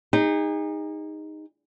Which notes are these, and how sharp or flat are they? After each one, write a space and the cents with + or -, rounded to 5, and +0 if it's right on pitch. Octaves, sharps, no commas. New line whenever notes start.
D#4 +0 G#4 -35